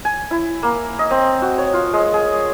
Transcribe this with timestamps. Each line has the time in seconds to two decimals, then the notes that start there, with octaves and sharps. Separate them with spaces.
0.05 G#5
0.31 E4
0.63 A#3
0.99 D#5
1.11 C4
1.42 F#4
1.58 C#5
1.73 F4
1.93 G#3
2.14 G#4